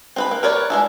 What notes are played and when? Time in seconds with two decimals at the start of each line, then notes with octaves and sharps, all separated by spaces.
0.16 C4 B4 B5
0.31 A#3
0.43 A#4 B4 C#5 D5
0.70 G#3 D4 E4